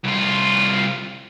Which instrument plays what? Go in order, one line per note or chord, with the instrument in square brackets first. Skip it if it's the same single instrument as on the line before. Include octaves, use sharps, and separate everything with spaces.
[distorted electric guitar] C2 F4